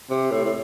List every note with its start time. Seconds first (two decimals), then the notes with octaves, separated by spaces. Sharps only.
0.10 C3
0.31 A2
0.45 A2